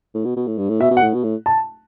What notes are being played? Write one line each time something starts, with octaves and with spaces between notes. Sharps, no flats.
A2
B2
B2
A2
G2
A2
B2 E5
B2
F#5
A2
B2
A2
A5